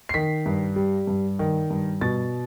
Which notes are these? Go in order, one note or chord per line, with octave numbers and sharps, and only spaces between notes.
C7
D#3 B6
G2
G3
G2
D#3
G2
B2 A6